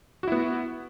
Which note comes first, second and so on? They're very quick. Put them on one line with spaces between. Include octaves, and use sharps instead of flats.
F#4 E4 B3